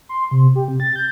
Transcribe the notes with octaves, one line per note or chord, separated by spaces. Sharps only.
C6
C3
G4
C3
A6
G6